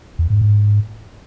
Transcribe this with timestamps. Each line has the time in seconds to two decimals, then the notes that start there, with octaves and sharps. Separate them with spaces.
0.19 E2
0.30 G#2
0.41 G#2